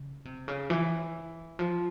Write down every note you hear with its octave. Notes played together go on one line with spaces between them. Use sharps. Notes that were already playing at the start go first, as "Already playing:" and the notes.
Already playing: C#3
C3
C#3
E3
F3